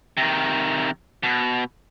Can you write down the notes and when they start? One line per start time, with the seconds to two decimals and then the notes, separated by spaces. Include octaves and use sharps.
0.17 C3 D#3
1.23 B2